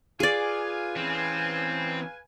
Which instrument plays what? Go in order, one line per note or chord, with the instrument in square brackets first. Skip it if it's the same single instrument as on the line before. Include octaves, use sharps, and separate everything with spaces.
[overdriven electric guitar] F4 [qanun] G#4 D5 [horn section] B4 F5 G#5
[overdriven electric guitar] E3 C#4 [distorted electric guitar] C4